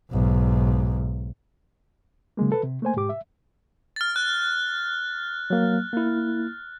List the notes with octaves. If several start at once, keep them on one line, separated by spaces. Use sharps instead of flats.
B1 G#2
C#3 F#3 G#3 A#3
A4 B4
C3
A3 A#3 C5 G#5
G#2 G4 D6
E5
F6 A6
F#6
F#3 A#3
A#3 E4